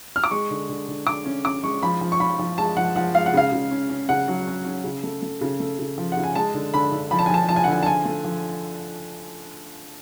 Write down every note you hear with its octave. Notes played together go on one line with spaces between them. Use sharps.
F6
D6
G#3 C#6
D3
D3
D3
D3 D6
C#4
C#4 D6
G#3 C#6
F3 B5
F3
C#6
F3 B5
F3
G#3 A5
F3 F#5
F3 F#5
G#3 F5
F#5
C#3 F5
C#3
C#4
C#4
C#3 F#5
F#3
C#4
C#4
C#3
A3
A3
C#3
A3
C#3
F3
F#5
C#3
G#5
G#3 A5
D3
D3 B5
D3
F3 B5
A5
G#5
F3 A5
F3 A5
G#5
F#5
D3 G#5
A5
F3 G#5
A3
F3